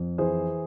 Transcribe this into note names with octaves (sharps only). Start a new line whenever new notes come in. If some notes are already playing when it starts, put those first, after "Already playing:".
Already playing: F2
E3 G#4 C5